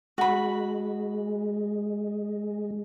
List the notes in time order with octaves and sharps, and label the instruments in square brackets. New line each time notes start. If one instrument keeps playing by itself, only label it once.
[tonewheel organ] G#3 [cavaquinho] F#4 B5